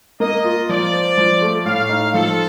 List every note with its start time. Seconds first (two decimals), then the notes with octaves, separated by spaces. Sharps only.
0.20 A#3 D#5
0.44 F4
0.69 F3 D5
0.93 C5
1.18 F3
1.41 A3
1.65 A2 F5
1.89 D#4
2.14 F3 A4